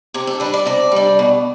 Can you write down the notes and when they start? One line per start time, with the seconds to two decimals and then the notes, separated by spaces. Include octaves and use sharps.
0.14 C3 G4
0.27 A4
0.40 G3 D4 B4
0.54 D5
0.66 C3 D5
0.92 G3 D4
1.19 B2